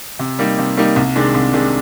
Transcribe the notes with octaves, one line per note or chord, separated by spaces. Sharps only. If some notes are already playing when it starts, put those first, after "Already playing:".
C3
G3 A#3 D#4
C3
G3 A#3 D#4
C2
C3 D#3 G#3 D4
C2
C3 D#3 G#3 D4